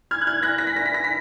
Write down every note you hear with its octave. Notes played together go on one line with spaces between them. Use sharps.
F6 G#6
F#6
F6 G#6
F#6 A#6
A#6
B6
A#6
B6
A#6
B6